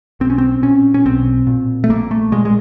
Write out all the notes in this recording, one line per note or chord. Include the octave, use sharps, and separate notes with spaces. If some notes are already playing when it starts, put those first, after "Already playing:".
B1 C4
C#4
C4
A#2 C#4
C#4
B1 C4
A#2
A3
A#1 A#3
A3
A#2 G#3
G#3